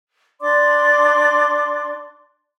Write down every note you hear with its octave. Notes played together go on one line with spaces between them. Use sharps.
D4 D5 C6 D6